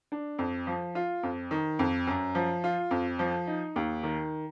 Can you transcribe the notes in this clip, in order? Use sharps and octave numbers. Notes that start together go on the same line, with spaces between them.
D4
F2
F3
F4
F2
D#3
F2
F#2
F3
F4
F2
F3
D#4
D#2
D#3